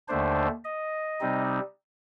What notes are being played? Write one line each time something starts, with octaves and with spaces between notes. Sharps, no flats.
D#2 D3 A3 D4 C5
D#5
C3 G3 C4 D#4